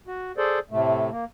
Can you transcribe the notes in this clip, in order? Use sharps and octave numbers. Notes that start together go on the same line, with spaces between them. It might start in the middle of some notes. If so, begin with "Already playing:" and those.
F#4
G#4 A4 C5 D5
A2 C3 A3
A#3